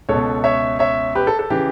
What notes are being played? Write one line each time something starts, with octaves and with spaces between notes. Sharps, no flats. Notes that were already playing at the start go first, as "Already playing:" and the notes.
C#2 B2 A4 C#5
C#5 E5
C#5 E5
G4 B4
A4
A4
C#3 E3 G4